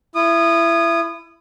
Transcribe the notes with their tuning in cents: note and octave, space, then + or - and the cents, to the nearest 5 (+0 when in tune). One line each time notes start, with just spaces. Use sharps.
E4 +25 D#6 -20